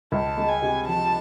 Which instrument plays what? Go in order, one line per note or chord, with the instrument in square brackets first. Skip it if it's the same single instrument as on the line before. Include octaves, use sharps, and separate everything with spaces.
[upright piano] C#2 [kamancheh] A5
[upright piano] G#3
[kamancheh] G#5
[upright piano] C3
[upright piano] F3 [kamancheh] A5